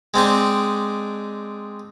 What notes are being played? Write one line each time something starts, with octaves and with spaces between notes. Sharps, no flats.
G#3 C4 D4 D#4